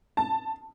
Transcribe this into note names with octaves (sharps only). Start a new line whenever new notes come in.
A5